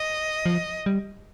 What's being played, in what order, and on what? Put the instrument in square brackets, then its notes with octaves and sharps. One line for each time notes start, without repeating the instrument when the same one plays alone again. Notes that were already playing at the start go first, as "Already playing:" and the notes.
Already playing: [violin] D#5
[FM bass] F3
G3